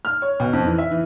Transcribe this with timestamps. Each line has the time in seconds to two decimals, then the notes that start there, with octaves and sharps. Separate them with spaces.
0.05 F6
0.22 C#5
0.40 B2
0.53 F2
0.66 E3
0.78 E5
0.91 E3